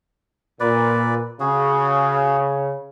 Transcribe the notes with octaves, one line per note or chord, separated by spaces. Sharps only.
A#2 B4 D5
C#3 F#4 G#4